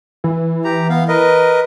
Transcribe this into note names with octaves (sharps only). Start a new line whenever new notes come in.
E3
G4 A#5
B3 F5
A#4 B4 D#5